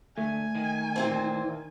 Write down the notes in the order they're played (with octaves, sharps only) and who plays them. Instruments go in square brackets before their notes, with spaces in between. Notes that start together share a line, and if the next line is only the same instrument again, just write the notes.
[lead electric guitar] D2 [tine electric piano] A3 [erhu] G#5
[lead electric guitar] D#3
[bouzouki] A#2 E3 C4